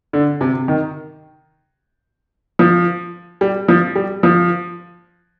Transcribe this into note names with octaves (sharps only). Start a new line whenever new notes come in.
D3
C3
D#3
F3
G3
F3
G3
F3